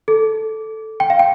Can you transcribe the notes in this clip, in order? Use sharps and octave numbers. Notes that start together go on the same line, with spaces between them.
A4
G5
F5
G5